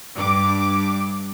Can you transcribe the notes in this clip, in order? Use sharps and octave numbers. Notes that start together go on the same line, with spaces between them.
G2 D6